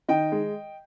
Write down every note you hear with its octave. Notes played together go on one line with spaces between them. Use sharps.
D#3 D#5 G5
G#3